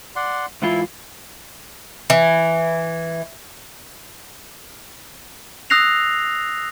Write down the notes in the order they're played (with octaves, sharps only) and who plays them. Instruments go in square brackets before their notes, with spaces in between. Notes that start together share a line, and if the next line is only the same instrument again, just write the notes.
[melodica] D5 F#5 C6
[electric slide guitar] G#2 E3 F4 [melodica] E4
[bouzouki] E3
[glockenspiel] D#6 E6 F#6 A#6 C7 F7